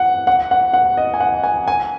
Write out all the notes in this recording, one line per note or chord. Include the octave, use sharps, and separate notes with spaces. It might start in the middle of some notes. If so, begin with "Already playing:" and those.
Already playing: F#5
F#5
F#5
F#5
D#5
G#5
F#5
G#5
G#5